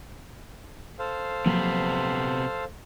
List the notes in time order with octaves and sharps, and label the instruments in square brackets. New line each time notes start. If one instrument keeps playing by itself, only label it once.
[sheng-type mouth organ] A4 C5 F5
[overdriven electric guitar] C3 B3 [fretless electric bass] F3 F#3 A#3